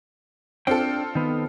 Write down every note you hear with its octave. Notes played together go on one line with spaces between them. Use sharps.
C4 D4 F4 A4 G5
D#3 B3